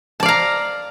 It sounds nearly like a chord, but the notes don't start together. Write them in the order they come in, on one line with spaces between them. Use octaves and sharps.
A5 D5 F5 A#5